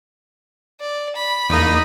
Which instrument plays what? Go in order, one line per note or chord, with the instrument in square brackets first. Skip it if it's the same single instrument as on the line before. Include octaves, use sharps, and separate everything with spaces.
[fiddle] D5
B5
[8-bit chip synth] E2 A#3 [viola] D#4 D#5